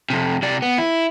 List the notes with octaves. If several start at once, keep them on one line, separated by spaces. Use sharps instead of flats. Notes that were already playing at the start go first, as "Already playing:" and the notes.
F2 C3
C3 D5
B3
E4